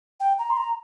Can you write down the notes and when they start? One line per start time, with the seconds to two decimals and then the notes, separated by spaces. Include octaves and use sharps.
0.20 G5
0.39 A#5
0.50 C6
0.57 A#5